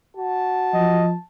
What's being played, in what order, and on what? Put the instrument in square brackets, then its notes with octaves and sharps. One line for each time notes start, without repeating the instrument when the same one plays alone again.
[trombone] F#4 [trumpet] A5
[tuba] F3 [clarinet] D#5